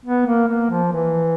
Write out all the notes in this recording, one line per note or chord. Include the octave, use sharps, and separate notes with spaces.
B3
A#3
A#3
F3
E3